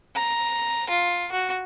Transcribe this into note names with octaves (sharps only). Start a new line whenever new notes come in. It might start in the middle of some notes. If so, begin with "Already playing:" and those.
A#5
F4
F#4